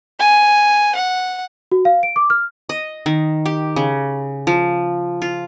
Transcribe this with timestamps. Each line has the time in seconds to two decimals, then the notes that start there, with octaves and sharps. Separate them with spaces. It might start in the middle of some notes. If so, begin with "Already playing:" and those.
0.19 G#5
0.95 F#5
1.72 F#4
1.85 F5
2.03 D7
2.16 D6
2.30 F6
2.69 D#5
3.06 D#3
3.45 G4
3.76 C#3
4.47 F3
5.22 F4